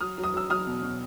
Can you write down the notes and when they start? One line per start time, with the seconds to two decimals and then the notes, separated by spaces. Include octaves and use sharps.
0.01 F#3 D#6 F6
0.18 F#3
0.24 D#6
0.34 F#3 E6
0.50 F#3 D#6 F6
0.67 B2
0.83 B2